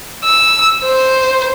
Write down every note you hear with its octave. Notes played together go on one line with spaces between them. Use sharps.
E6
C5